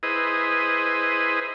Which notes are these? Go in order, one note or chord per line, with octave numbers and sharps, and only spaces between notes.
E4 G#4 B4 C5 D#5